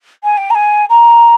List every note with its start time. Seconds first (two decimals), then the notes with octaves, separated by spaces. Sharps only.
0.24 G#5
0.37 G5
0.50 A#5
0.55 G#5
0.89 A#5